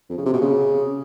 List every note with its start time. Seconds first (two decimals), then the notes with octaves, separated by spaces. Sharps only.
0.10 F2
0.18 C#3
0.26 C3
0.33 B2
0.41 C#3